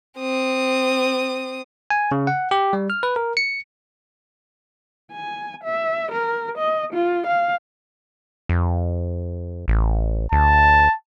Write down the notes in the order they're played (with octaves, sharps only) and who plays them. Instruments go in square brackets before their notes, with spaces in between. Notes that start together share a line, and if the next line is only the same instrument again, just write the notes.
[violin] C4 D#6
[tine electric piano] G#5
C#3
F#5
G4
G3
F6
B4
A#4
C#7
[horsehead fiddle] G#5
E5
A#4
D#5
F4
F5
[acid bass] F2
A1
[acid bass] D2 [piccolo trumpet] A5